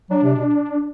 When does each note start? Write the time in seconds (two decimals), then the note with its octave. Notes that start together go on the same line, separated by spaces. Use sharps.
0.10 F#3 D4
0.23 C3
0.36 B2